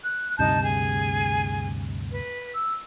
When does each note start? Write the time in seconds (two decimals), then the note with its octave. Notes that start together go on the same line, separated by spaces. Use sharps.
0.06 F#6
0.39 D2 G2 C3 D#4 A5 G6
0.62 G#4 G#5
2.12 B4
2.55 E6